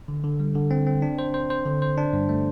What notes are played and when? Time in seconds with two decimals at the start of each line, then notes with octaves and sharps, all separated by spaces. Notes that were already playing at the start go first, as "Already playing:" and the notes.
0.08 D3
0.24 D3
0.40 G3
0.55 D3
0.71 C4
0.87 C4
1.02 D4
1.19 C5
1.34 C5
1.50 C5
1.66 D3
1.82 C5
1.98 D4
2.13 G2
2.29 A3